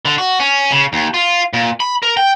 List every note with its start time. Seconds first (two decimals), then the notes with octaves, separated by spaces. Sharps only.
0.05 D3
0.18 F#4
0.40 C#4
0.72 C#3
0.93 D#2
1.14 F4
1.53 A#2
1.80 B5
2.03 A#4
2.17 G5